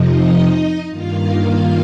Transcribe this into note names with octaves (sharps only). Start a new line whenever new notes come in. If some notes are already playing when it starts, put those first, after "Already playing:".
Already playing: F2 C3 F3 D#4 D#5
G2 D#3 A#3 F4 F5
F4 F5